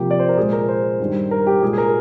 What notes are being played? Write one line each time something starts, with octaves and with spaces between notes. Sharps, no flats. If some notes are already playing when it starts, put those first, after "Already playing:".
Already playing: C3 F3 A#3 G4
D5
C5
A#4
A#2 G#3 G#4
A#4
C5
G2 D#3 G3
A#4
G4
A#2 G#3 G#4
G#4
A#4